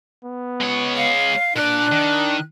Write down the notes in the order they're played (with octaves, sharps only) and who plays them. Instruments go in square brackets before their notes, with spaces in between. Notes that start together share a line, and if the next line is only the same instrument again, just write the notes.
[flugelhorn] B3
[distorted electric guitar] G#3 C#5
[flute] F5
[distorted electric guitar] A#2 D5 [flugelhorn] D4 [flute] F#6
[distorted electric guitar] D#3